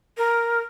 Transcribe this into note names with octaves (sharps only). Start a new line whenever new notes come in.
A#4